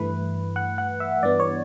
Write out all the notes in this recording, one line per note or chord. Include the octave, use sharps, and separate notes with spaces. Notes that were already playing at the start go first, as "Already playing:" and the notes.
Already playing: G2 E3 A3 B4
F#5
F#5
E5
G2 E3 B3 D5
C#5